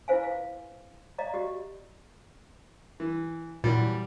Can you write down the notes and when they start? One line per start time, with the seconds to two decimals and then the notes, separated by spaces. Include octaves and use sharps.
0.08 E4 F4 B4 C5 F5 G#5
0.23 F5
1.18 D5 D#5 F5 A#5
1.34 F#4 G4 D#5
3.00 E3
3.64 F#2 A#2 E3 G3